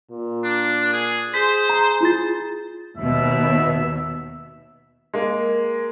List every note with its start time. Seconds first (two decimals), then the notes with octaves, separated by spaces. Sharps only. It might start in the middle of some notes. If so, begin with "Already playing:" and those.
0.11 A#2
0.44 D4
0.93 G#4
1.34 G#4 C5 B6
1.70 A#5
2.01 E4 F4 A6
2.97 D#2 B2 E5
5.14 G#3 A#3